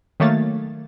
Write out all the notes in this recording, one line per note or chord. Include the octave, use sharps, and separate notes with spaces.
D#3 F#3 A3 A#3 C#5 A6